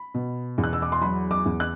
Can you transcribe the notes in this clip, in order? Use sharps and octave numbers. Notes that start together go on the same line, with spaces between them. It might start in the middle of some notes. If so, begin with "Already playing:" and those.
Already playing: B5
B2
E2
F#6
E6
D6
C6
F#3 B5
D6
E2
F#6